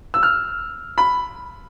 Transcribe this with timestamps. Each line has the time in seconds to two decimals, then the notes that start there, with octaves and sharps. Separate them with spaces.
0.14 E6
0.23 F6
0.98 B5